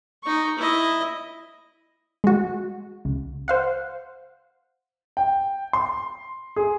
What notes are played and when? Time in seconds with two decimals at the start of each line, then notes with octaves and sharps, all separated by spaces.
0.24 D#4 C#6
0.59 E4 D#5
2.24 G#3 F#4
3.05 C#2
3.48 C5 F5 F#5
5.17 G5
5.73 C6
6.56 G#4